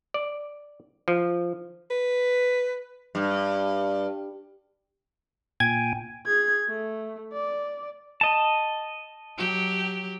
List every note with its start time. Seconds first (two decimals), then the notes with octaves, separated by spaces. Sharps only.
0.14 D5
1.08 F3
1.91 B4
3.15 G2
5.60 A#2 G5 G#5 G#6
6.26 G#4 G#6
6.68 A3
7.33 D5
8.21 D#5 A5
9.38 F#3 G4